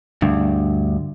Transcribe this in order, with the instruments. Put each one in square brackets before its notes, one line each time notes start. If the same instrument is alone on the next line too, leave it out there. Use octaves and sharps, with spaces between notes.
[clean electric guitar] D2 G2